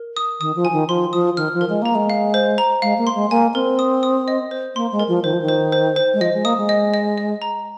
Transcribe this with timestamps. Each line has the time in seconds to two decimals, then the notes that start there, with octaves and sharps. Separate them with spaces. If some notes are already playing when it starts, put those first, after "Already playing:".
Already playing: A#4
0.17 D#6
0.40 D#3 D#6
0.56 F3
0.65 G#5
0.73 D#3
0.89 F3 C6
1.13 F3 D#6
1.37 D#3 F6
1.54 F3
1.61 A#4
1.69 G#3
1.82 A#3 A#5
1.95 G#3
2.10 F5
2.34 C5
2.58 A#5
2.82 G#3 F5
2.98 A#3
3.07 C6
3.15 G#3
3.30 A#3 G#5
3.54 C4 A#4
3.79 D#6
4.03 D#6
4.28 D#5
4.51 C5
4.75 A#3 C6
4.92 G#3
4.99 A#4
5.08 F3
5.24 D#3 C5
5.34 F3
5.42 D#3
5.48 C5
5.72 C5
5.96 C5
6.14 G#3
6.21 F3 D#5
6.33 G#3
6.45 A#3 D#6
6.58 G#3
6.69 D#5
6.94 D#5
7.18 D#5
7.42 A#5